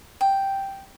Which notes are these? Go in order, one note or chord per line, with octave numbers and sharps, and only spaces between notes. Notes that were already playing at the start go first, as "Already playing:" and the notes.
G5